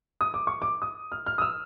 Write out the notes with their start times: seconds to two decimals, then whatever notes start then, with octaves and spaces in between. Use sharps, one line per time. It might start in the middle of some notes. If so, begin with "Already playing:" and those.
0.21 D#6
0.34 D6
0.47 C#6
0.62 D6
0.82 D#6
1.12 F6
1.26 F6
1.38 D#6
1.42 E6